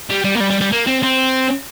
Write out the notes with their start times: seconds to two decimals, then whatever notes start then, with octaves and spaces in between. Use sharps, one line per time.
0.10 G3
0.24 G3
0.35 A#3
0.40 G3
0.50 G3
0.61 G3
0.72 A#3
0.87 C4
1.03 C4